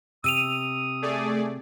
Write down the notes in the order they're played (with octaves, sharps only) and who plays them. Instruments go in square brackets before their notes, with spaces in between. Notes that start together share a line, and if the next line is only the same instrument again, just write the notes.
[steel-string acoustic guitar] C3 [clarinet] D#6 [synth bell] E6 D#7 F7
[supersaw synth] A3 G#4 D5